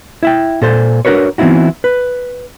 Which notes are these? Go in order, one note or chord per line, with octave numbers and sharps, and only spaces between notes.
E4 E5 G5
A#2 A4 C5
D4 F#4 A#4 B4 C#5
E3 B3 C4 D#4 E4 F#4
B4